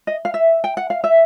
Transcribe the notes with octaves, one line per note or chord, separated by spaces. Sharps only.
D#5
F5
E5
G5
F#5
F5
E5